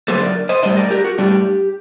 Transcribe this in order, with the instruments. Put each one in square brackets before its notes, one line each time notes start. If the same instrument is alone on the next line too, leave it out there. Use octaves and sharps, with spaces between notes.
[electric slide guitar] D3 F#3 A#3 A4 C5
A#4 D5
C5 D#5
A2 G3 D4 C5 D#5
A#4 D5
G4 A#4
F#4
A2 G3 D4 G4